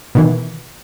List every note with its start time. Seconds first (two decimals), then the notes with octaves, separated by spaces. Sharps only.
0.15 B2 D#3 E3